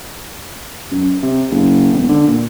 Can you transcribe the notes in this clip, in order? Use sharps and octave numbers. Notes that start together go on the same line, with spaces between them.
F#2
C3
F#1
E1
D3
A#2